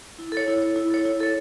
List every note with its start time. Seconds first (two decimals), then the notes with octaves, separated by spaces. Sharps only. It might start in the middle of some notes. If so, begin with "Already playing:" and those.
0.19 E4
0.32 A4 C#5
0.48 E4
0.62 A4 C#5
0.76 E4
0.91 A4 C#5
1.06 E4
1.20 A4 C#5